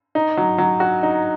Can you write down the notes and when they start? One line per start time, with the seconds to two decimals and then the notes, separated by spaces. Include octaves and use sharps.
0.15 D#4
0.37 F#3
0.58 F#3
0.80 F#4
1.03 D#4